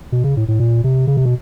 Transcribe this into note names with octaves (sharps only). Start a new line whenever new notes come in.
B2
C#3
A2
A2
A#2
C3
C#3
C3
B2